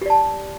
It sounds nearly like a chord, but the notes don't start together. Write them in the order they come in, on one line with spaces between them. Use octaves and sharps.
G4 D5 A5